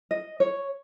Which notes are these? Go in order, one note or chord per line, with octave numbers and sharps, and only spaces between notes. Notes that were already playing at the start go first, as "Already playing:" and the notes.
D#5
C#5